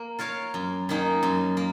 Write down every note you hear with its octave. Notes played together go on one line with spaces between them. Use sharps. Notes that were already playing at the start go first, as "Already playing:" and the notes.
Already playing: A#3
F4 A#4 C#5 F5
F#2
D#3 A#3 D#4 G#4
F#2
A#3